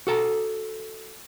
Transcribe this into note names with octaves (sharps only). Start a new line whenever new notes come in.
F#4 A4 A#5